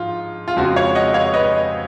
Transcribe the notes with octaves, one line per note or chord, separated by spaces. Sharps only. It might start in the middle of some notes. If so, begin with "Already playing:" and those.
Already playing: G#2 F3 F4
F4
F2 C#3 F3 G#3 F#4
C#5 F5
D#5 F#5
C#5 F5
B4 D#5